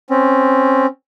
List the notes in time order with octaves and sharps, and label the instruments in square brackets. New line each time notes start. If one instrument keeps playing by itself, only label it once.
[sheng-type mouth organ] C4 C#4